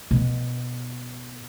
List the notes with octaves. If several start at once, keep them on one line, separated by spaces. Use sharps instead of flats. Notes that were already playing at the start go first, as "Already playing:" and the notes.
B2